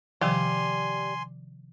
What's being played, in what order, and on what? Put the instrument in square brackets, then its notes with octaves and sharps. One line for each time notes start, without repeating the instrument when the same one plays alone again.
[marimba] C3 D#3 F3 [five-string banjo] G3 [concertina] G#5 C6